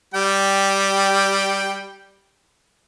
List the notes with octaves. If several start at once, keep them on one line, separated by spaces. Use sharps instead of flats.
G3 G5